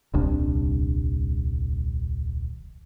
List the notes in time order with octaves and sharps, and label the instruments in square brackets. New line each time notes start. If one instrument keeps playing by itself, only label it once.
[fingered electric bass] D#1 C2 D4